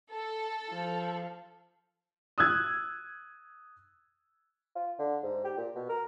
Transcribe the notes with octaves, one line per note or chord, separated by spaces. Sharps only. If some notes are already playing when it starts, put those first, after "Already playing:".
A4
F3
D#6 E6 F#6 G#6
F4
D3
G#2
G4
A#2
B2
A#4